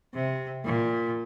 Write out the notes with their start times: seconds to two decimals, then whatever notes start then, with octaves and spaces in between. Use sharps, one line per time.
0.14 C3
0.65 A#2